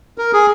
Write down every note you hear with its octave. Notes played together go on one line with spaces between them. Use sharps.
A#4
G#4